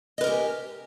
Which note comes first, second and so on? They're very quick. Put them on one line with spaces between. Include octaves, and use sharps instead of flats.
D#5 B4 A#4 G4 G#5